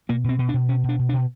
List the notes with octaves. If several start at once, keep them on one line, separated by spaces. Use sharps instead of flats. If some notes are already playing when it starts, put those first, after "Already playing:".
B2 A#3
B2 C4
B2
D4
B2
B2 C#4
B2
D4
B2
D4
B2